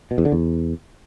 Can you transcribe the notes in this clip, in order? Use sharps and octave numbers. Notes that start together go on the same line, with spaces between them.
B2
E2
D3
E2